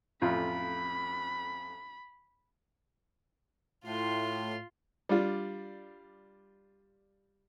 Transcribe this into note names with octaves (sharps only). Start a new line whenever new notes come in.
A1 F2 F4 B5
A2 F4 C6
G3 D4 F4